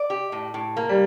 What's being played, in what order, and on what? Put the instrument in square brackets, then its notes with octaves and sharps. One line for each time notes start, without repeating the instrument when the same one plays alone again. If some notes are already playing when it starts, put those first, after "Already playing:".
Already playing: [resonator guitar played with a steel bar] D5
G4
A2
A2
A#3
[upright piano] G3